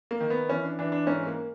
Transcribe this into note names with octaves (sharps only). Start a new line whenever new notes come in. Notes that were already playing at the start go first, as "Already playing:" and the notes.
A#3
D#3
B3
E3 C#4
D4
E3 D4
D4
G#2 C#4
A#3